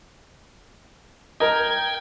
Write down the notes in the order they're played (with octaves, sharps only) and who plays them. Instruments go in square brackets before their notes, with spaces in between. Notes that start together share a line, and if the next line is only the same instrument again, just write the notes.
[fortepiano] A#4 D#5 [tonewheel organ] G5 G#6